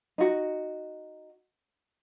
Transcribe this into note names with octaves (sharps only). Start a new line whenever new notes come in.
D#4 F#4